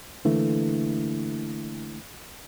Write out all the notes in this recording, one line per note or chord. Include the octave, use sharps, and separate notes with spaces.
D3 E3 A3 A#3